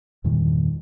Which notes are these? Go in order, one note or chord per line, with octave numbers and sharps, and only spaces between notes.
E2 G2 A#2 D#3